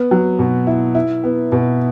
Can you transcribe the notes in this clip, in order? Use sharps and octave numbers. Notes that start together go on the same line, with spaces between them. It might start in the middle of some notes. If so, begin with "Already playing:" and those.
Already playing: B3
F#3
B2
E4
E4
B3
B2